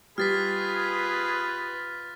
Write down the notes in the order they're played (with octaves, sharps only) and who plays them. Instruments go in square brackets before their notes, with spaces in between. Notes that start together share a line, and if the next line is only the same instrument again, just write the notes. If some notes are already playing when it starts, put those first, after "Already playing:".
[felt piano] G3 [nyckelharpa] F4 B4 [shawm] G#4 [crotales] F6 A6 B6